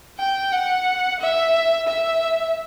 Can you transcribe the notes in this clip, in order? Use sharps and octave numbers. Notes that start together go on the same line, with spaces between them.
G5
F#5
E5
E5